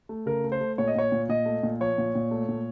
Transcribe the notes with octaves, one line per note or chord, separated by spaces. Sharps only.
A3
C#3 A#4
A3
C5
A3
A#2 C#5
D#5
A#2 C#5
A#2
A#2 D#5
A3
A#2
F3 C#5
A#2
A#2
A3
A#2